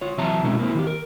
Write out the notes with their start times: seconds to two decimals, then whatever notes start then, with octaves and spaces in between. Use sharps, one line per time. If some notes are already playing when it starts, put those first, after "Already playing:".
0.01 F4 C#5
0.18 C3 E3 F#3 E5 A5 A#5
0.44 B2 G#3 A3 C#4 E4
0.59 A#3 C4 E4
0.75 D#3 F4 G4
0.87 A#4